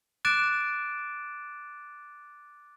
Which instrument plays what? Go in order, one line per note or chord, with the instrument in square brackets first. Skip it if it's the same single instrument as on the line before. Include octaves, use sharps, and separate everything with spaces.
[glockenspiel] D6 F#6 A6 D7 E7